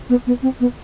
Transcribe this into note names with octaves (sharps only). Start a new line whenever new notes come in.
B3
B3
C4
B3